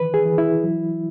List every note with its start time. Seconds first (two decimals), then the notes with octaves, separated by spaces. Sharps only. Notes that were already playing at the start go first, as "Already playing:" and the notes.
Already playing: D#3 E3 B4
0.14 G#4
0.26 E3
0.38 E4
0.63 F#3